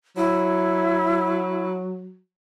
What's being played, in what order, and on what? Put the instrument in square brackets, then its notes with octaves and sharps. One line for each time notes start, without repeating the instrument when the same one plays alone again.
[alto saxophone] F#3 [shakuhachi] E4